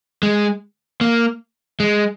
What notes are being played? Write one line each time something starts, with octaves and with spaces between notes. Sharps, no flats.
G#3
A#3
G#3